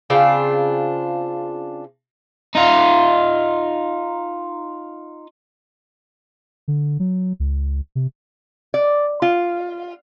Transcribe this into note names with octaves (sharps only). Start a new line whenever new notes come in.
C#3 C4 D4 F4
D#4 F4
D3
F#3
C#2
C3
D5
F4